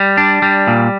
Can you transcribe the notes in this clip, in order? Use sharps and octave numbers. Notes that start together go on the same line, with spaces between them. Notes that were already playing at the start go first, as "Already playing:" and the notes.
Already playing: G3
D4
G3
A#2